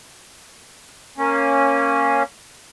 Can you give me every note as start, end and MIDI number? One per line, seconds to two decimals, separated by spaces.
1.18 2.23 58
1.18 2.23 61